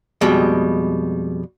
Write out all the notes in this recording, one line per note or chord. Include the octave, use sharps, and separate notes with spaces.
F2 B2 G3 G#3